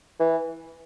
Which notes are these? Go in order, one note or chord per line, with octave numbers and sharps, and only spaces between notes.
E3